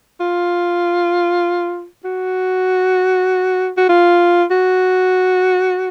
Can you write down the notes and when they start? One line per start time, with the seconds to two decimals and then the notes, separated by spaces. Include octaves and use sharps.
0.20 F4
2.04 F#4
3.77 F#4
3.89 F4
4.51 F#4